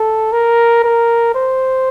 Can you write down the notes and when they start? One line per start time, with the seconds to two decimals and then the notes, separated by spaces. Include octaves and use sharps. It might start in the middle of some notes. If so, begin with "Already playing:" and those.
Already playing: A4
0.32 A#4
0.84 A#4
1.35 C5